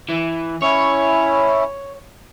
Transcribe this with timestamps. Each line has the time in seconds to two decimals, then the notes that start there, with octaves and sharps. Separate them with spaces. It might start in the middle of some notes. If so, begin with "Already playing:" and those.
0.09 E3
0.62 C#4 E4 C#5